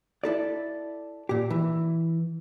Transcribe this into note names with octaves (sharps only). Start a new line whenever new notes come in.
E4 A4 D5
A#2 G4
E3